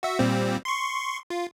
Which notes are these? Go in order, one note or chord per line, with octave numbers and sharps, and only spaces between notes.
F#4 E5
A#2 G3 C4
C6 C#6
F4